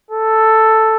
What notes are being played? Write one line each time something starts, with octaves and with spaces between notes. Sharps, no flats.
A4